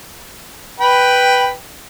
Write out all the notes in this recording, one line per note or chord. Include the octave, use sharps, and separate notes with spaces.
B4 G5 B5